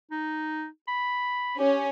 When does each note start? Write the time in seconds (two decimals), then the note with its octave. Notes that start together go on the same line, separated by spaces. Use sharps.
0.11 D#4
0.88 B5
1.59 C#4 G4